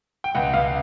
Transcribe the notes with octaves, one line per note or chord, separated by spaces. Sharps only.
G5
C#2 F#5
C#2 F5